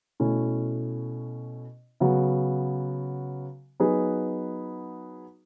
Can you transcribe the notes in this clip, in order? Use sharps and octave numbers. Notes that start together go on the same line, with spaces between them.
B2 A3 C#4 E4
C#3 F#3 B3 F#4
F#3 B3 D#4 G#4 B4